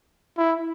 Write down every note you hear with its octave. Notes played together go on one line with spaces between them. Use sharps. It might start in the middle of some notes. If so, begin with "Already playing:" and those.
E4